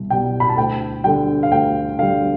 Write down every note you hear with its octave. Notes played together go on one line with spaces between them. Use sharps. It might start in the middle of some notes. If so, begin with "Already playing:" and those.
Already playing: C2 B2
B2 G3 G5
B5
A5
D2 G5
D3 G3 G5
F5
D2 G5
D3 G3 F5